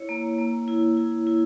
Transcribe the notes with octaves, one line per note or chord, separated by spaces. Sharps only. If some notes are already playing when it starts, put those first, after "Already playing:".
Already playing: E4 C#5
A#3
A#3
E4
E4
E4